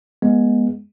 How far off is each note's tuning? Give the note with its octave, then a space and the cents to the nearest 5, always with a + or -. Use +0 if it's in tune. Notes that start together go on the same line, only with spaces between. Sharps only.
G#3 +0 B3 -30